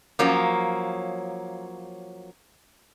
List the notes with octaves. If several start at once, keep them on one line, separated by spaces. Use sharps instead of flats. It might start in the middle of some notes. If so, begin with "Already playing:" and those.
F3 F#3 A#3 C#4